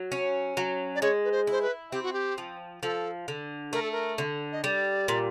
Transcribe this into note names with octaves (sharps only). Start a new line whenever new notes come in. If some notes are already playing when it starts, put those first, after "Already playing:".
Already playing: F#3
C#4
F#3
D5
G#3 C#5
B4
C5
E4 C5
B4
C4 G4
F#4
G4
F3
F3 A4
D3
A3 A#4
A4
A#4
D3
D#5
G3 D5
A#2